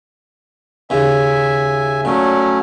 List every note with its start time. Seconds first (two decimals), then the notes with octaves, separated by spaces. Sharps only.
0.90 D#2 C#3 E5 G#5
2.05 A#2 F#3 A3 C#4